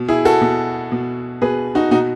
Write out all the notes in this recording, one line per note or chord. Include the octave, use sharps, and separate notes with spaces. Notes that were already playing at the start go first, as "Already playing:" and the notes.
Already playing: B2
E4 G#4
F#4 A4
B2
B2
B2 G#4 B4
D#4 F#4
B2 D#4 F#4